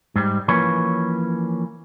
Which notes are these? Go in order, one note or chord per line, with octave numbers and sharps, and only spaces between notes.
G#2 G3
E3 F3 A#3 C#4 B4 C#5